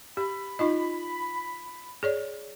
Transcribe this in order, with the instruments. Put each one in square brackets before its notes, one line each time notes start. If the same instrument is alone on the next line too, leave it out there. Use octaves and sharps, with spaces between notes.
[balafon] G4 [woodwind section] B5
[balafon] D#4 F4 D#5
G#4 C#5 D5